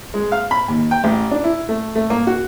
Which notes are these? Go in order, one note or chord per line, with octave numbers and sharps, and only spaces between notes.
G#3
F5
B5
D#2
G5
A1
D4
E4
A3
A3
A#3
F#4